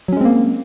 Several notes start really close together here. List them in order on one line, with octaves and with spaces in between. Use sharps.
F#3 C#4 G#3 C4 A#3